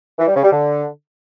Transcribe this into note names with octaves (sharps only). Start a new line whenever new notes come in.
E3
G3
C#3
G3
D3